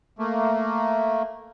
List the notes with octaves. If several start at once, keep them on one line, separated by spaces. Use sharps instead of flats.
A3 A#3